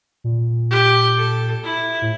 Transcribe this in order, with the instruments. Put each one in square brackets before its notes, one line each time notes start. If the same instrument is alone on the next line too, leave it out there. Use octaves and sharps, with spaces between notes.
[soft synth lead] A#2
[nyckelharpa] G4
A4
E4
[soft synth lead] A2